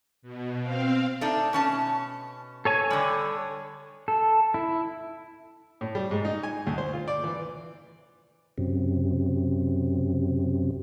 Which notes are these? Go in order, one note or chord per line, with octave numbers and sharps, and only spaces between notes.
B2
C4 F5
A3 D4 D#4
B2 C#4 A5
A4 C#5 G#5
D3 G3
A4
E4
A2
G3
G#2
D#4
G#5
D2
C5
F4
D5
E3
F#2 C3